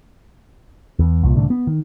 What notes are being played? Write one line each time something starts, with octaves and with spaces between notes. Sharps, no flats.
E2
C2 A#2
C2 A2 D3
B3
D#3